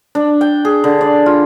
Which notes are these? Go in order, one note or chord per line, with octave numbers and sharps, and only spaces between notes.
D4
G5
G#4
D3
D5
F4